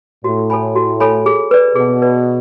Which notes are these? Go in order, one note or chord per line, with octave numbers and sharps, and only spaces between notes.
A2 F#4
A4 C#5 G#5 B5
F#4
A4 C#5 G#5 B5
G#4
B4 D5
B2 G#4
B4 D5